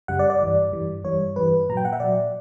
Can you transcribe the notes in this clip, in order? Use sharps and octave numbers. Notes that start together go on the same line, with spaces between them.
F#2 C#3 G3 F#5
D5
D5
G2 E3 G3
G2 E3 G3
G2 E3 G3 C#5
G2 E3 G3 B4
A#2 F#3 A#5
G5
F#5
E5
A#2 F#3 D5